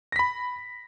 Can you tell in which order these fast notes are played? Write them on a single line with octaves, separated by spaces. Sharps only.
A#6 B6 B5